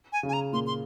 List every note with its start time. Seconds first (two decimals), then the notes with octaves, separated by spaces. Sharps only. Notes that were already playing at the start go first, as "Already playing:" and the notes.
0.12 G#5
0.23 C#3
0.29 G#5
0.33 A#5
0.53 A#2 C6
0.67 C6